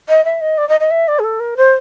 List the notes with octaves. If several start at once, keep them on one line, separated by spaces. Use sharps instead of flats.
D#5
E5
D#5
D5
D#5
D#5
E5
D5
G#4
A4
A#4
C5